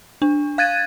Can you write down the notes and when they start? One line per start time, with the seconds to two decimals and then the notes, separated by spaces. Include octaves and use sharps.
0.22 D4
0.58 F5 F#6 G#6 A6 D#7